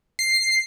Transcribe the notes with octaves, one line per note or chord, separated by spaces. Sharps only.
C7